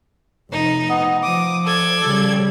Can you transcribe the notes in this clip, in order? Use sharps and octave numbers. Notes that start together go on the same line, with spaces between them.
F1 D#4
B3 D#5
F3 D6 D#6
A4 D5 G#6
C#3 G3